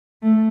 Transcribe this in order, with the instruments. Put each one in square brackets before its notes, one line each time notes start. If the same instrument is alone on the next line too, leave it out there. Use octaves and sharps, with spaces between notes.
[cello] A3